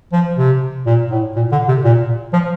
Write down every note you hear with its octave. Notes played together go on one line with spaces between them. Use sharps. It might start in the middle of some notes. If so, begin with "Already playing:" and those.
F3
C3
A#2
A2
A#2
D3
C3
A#2
F3